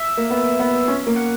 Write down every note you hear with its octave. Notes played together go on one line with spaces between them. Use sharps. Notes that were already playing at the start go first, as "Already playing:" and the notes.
Already playing: E5
A#3
B3
B3
C#4
A#3
F#5